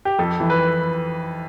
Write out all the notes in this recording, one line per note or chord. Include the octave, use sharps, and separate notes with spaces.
G4
F2 A4
E3
B4